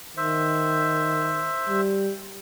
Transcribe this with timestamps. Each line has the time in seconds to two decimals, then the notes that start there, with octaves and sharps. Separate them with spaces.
0.17 D#3 C5 E5
1.69 G3